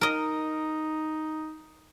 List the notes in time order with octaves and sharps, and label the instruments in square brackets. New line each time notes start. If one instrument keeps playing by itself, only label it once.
[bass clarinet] D#4 [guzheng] A#4 D#5